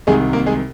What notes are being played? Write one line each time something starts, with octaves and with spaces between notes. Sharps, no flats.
C2 C3 D#3 G#3 G#4
A#3 A#4
G#3 G#4